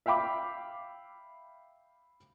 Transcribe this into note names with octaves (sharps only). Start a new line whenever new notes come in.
E5 F5 G5 B5 D6